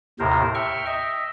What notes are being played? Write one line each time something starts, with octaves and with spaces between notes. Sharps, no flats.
D#2 A2 C3 A#4 C5
E5 G5 C#6 F6
D#5 E5